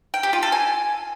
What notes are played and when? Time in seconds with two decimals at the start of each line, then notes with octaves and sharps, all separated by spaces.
0.14 G5
0.23 G4
0.33 F4
0.43 A4
0.52 G#5